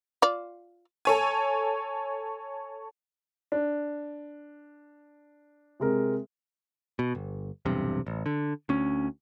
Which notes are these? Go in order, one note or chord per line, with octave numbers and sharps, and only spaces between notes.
F4 D5
A4 C#5 G#5
D4
C3 G#3 A#4
B2
G1
B1 E2 G2 C3
A1
D3
D2 C#4